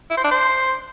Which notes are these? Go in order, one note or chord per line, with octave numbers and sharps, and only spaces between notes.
E4
C5
D4
C5